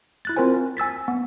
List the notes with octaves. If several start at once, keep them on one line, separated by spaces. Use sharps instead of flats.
E4 F#6 A6
C4 F4 A#4 C5 G#5
G#5 E6 A6 B6
B3